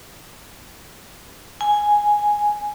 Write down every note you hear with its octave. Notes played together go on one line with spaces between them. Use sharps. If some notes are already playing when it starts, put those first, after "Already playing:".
G#5